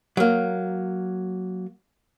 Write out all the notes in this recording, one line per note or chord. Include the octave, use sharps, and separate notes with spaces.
F#3 A#3